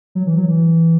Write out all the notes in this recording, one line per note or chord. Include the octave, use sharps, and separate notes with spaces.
F#3
E3
F#3
E3